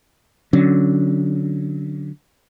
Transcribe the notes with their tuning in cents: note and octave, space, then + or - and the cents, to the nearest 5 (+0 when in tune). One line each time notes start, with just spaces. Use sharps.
D3 -5 F#3 +0 C#4 +0